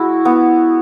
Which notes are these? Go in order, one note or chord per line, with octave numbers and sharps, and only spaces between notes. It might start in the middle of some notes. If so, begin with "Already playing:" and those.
Already playing: G#3 E4 F#4
B3